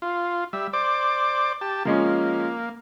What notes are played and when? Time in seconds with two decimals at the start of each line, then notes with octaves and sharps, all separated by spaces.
0.02 F4
0.53 G3 E5
0.73 C5 D5 D6
1.61 G4 A5
1.85 F3 G#3 A#3 C#4